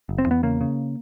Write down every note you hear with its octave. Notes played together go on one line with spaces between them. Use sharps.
F#1
C4
E2 B3
C#3 A#3
C#3